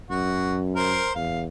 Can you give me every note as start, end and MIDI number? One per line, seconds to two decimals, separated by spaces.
0.10 1.03 42
0.10 0.58 66
0.75 1.11 70
0.75 1.11 72
1.15 1.48 40
1.15 1.41 77